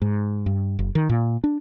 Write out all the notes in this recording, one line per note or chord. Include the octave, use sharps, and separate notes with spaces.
G#2
G2
F#1
D#3
A#2
D4